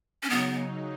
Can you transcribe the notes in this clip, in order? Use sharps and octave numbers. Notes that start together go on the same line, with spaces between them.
C#4
C#3 F#3 B3 D#4